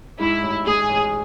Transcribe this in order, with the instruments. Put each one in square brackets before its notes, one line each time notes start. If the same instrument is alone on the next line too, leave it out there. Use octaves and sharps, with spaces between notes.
[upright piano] G#2 [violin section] E4
[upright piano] A1
[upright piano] G#3 [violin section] G#4
[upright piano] A1